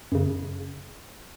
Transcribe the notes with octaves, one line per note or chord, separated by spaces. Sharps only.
F#2 C#3